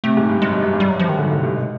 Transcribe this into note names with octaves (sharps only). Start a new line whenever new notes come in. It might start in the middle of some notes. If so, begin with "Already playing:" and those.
C3 A3
G#2
G2
F#2 G#3
G2
F#2
G2
F#2 G3
G2 F#3
F3
F#2
D#3
G#2 D3
A2
C3
G2
B2